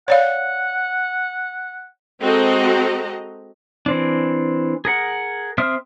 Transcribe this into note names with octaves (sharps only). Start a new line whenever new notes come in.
C#5 D5 F5 F#5
G#3 C4 F#4 A4 D#5 A#5
E3 C4 D4
G#4 A#4 F#5
C4 E5 C6 D#6 F6